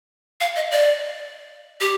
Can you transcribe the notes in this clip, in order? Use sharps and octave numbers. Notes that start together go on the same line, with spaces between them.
F5
D#5
D5
G4